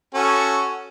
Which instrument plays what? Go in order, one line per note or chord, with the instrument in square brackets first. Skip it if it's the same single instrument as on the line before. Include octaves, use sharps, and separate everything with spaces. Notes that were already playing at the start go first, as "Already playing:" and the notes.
[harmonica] C#4 F#4 A4